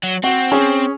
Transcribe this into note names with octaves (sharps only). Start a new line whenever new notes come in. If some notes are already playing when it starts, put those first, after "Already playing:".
F#3
C4 F#4
C#4 G#4